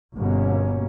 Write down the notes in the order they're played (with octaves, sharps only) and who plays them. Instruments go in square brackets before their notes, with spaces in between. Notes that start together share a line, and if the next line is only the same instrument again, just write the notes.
[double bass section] G1 B2 A#3 C#4